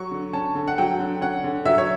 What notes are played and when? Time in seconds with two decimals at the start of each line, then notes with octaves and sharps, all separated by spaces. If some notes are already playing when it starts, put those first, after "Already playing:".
Already playing: F#3 C#6
0.11 D3
0.33 C#4 A5
0.55 D3
0.68 F#5
0.78 F#3 G5
0.99 D3
1.21 C#4 F#5
1.44 D3
1.66 F#3 E5
1.78 C#5